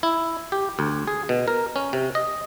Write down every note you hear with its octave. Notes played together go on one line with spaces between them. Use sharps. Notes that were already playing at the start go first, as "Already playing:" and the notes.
E4
G4
D2
G#4
B2
A#4
C#4
C3
D#5